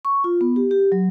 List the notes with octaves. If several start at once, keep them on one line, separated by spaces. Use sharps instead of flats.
C#6
F4
B3
G4
G4
F#3